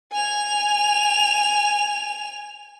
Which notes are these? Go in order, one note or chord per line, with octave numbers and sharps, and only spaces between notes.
G#5 F7